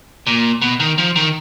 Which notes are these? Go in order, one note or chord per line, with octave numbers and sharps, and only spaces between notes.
A#2
B2
D#3
F3
D#3